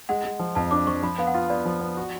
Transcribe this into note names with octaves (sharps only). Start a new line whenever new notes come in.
G#3 F#5
G#3
F3
F2 A5
D4 D6
F3 C#6
F3 B5
B3 F5
F#5
F4 F5
B3 D5
F3
B3
F#4